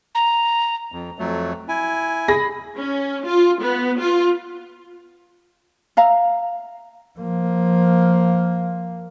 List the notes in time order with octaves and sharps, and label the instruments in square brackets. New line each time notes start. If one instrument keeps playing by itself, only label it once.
[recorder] A#5
[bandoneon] F2
F2 F#3 A3
E4 G#5
[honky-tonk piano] G#4 B5 A#6
[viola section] C#4
F4
B3
F4
[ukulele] E5 F5 A#5
[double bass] F3 A#3